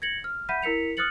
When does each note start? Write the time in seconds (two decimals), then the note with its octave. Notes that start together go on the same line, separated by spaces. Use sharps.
0.02 G#6 A#6 C#7 F#7
0.24 F6
0.49 E5 F#5 B5 G6 B6 D#7
0.62 E4 A#4 B6 C#7 F7
0.97 D#6 F6 F#6 A6 C#7 F#7